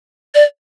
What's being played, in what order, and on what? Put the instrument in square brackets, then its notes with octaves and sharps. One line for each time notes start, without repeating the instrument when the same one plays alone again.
[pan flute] D5